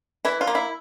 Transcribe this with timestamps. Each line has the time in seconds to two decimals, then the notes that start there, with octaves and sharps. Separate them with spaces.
0.25 E3 E4
0.41 F4
0.47 A#3
0.55 E4